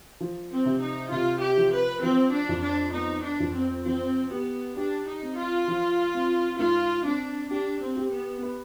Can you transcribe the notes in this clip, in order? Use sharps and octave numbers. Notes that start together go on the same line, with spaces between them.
F3
C4
C3
D#4
C3 F4
G4
F3
B4
F3 C4
D4
F2
D4
B3 D#4
D4
F2
C4
F3 C4
B3 G4
D4 G4
D#4
C4
F4
F3
C4
G#2 F4
C4 D4
D4 G4
C4
G4
B3
B4